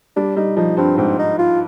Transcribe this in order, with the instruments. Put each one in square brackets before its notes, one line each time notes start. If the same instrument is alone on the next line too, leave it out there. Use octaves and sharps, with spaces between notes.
[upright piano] G3 [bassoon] D4
[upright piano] G3 [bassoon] D#4
[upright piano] F3 [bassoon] D#4
[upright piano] G2 [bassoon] C4
[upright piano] G#2 [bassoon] C4
[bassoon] D#4
F4